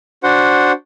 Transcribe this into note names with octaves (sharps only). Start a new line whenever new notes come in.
D4 F#4 C5 F#5